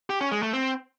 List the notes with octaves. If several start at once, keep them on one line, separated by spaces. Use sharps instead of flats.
G4
C#4
G#3
A3
C4